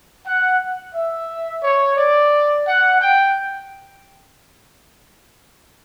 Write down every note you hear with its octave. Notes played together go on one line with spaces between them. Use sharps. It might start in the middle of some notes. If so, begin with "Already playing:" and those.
F#5
E5
C#5
D5
F#5
G5